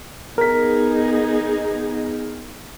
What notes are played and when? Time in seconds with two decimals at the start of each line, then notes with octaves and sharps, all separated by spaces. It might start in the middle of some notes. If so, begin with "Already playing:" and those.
0.38 B3 D#4 G#4 A#4 B6